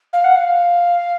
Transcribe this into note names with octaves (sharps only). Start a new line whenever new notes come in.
F5
F#5
F5